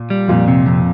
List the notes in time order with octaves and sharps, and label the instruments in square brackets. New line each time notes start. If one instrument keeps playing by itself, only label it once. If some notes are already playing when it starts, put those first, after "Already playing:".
Already playing: [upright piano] A#2
[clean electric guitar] G3
[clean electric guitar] F2 [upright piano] A#2
[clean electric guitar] C3
F2